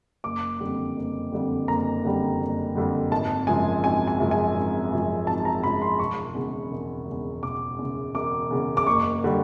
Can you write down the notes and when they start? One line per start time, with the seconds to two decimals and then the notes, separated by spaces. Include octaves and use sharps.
0.24 F#1 D6
0.60 F2 D3 G3
0.96 F#1
1.32 F2 D3 G3
1.68 F#1 A#5
2.04 F2 D3 G3
2.40 F#1
2.75 F2 D3 G3
3.11 G#1 A5
3.47 F#2 C#3 F3 G#3 G#5
3.83 G#1 G#5
4.07 G#5
4.19 F#2 C#3 F3 G#3
4.31 G#5
4.56 G#1
4.92 F#2 C#3 F3 G#3
5.27 G#1 A5
5.45 A#5
5.63 F#2 C#3 F3 G#3 B5
5.82 C6
5.99 E1 C#6
6.35 E2 C#3
6.71 E1
7.07 E2 C#3
7.43 E1 D6
7.79 E2 C#3
8.15 E1 D6
8.51 E2 C#3
8.77 D6
8.86 F#1 C#6
9.24 D3 G3